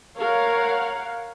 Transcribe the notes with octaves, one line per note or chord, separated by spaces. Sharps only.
A#4 C#5 F5 F#5